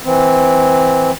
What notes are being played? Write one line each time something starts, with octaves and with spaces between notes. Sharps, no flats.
E3 C4